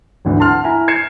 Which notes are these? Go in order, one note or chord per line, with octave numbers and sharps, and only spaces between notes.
G#1 D2 D3 E3
F#5 A5 C6 F6
E4 G#5 A#5
G#6 C7 C#7 E7